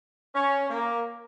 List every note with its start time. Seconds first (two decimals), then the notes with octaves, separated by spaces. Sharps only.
0.34 C#4
0.69 A#3